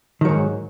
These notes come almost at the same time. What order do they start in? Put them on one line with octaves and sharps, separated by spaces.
D#3 F#3 G#2